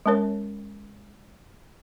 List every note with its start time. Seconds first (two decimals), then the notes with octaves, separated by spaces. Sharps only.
0.06 G#3 C#4 A#4 C#5